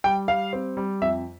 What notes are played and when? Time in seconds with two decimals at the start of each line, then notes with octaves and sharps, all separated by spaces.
0.04 G3 G5
0.28 G3 F5
0.53 C4
0.77 G3
1.01 F2 E5